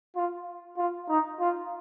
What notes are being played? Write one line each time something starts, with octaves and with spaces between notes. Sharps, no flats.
F4
F4
D#4
F4